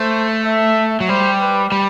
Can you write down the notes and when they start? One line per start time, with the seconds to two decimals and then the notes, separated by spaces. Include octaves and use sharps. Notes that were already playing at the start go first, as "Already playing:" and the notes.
Already playing: A3 C5
0.45 E5
1.00 F#3
1.09 G3 C5
1.41 B4
1.72 G3